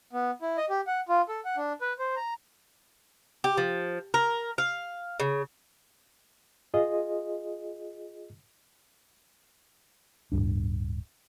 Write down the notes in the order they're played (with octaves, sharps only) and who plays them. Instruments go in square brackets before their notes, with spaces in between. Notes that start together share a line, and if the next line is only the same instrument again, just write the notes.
[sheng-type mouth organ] B3
E4
D#5
G4
F#5
F4
A4
F#5
D4
B4
C5
A#5
[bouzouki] G4
F3
A#4
F5
C#3
[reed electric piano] F4 G#4 D#5
[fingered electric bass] D1 G1 G2 D4